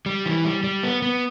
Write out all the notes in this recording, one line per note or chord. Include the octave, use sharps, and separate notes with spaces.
G3
E3
G3
G3
B3
B3